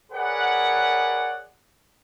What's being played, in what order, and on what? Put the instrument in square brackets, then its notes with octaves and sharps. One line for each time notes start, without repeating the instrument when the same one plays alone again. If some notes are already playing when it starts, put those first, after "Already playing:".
[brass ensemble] G#4 A#4 B4 C#5 D5 F#5